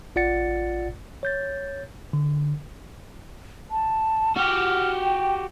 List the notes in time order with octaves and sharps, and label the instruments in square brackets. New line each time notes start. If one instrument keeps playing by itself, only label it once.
[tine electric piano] A1 F4 D5 F#5 A6 C#7
C#5 G6 A6
D3
[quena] A5
[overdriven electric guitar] F#4 G4 [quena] F6
[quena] G5